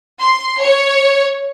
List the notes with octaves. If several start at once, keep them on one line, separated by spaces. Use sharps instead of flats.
C6
C#5